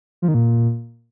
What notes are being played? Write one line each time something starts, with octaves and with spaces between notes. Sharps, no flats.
F3
D#3
A#2